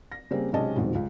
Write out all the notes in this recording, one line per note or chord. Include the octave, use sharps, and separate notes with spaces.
A#6
C#3 G3 A#3 C4
B1 C3 G#3 C#4 D#5 A5
D#1 F2 G#2 B2
C#2